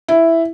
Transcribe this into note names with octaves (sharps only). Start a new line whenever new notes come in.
E4